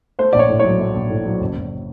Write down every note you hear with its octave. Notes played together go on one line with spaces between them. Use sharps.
A3 C5
A#1 D5
C#5
A2
F#3 C#5
A3
A#1
A2
F#3
F#1
F#1